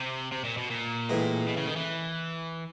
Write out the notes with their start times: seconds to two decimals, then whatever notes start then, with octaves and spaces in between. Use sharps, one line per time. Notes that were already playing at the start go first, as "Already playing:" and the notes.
Already playing: C3
0.32 C3
0.45 A#2
0.58 B2
0.71 A#2
1.09 A2 E3 G#3
1.47 B2
1.57 C#3
1.67 D#3
1.76 E3